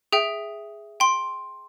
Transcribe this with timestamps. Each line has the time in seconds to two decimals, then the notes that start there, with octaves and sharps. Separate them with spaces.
0.13 G#4 E5 G5
1.00 G5 C6